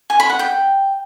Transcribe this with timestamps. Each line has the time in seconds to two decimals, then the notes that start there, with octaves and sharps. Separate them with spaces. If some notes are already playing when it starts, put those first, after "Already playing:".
0.10 G#5
0.20 B5
0.29 F#5
0.39 G5